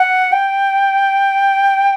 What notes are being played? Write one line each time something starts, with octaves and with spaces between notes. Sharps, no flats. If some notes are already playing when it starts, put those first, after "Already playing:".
Already playing: F#5
G5